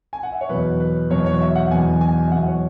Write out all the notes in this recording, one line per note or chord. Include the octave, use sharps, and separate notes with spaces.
G#5
F#5
E5
C#5
E2 B2 F#3 B4
B4
E2 B2 F#3 C#5
C#5
E5
F#5
E2 B2 F#3 G#5
G#5
E5
E2 B2 F#3 F#5
C#5